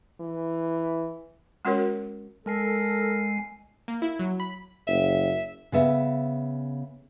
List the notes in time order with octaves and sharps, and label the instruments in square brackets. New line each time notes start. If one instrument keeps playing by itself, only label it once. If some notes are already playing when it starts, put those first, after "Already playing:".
[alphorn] E3
[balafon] G#3 C#4 F#4 A#4 C#5
[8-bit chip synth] G#3 G#5 C7 [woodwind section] A4 A#4
[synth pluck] A#3
E4
F#3
B5
[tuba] F#1 [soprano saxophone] E5
[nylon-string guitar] C#3 B3 E5